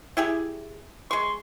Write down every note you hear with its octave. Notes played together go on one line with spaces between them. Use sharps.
E4 G4 G#4
G#3 C6 C#6